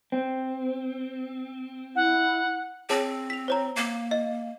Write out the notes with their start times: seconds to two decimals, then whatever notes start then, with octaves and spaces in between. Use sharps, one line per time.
0.12 C4
1.96 E4 F#5
2.90 C4 G#4 C#5 A5
3.30 B6 F7
3.48 C5 C#5 A#5
3.76 A#3
4.11 D#5